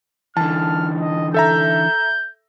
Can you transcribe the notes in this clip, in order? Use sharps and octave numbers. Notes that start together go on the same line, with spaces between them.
D3 E3 A5 F6
D#5
A4 E5 A#5 G6